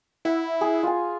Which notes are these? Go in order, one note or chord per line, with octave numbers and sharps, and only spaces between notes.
E4 F#5
G#4
F4 G#5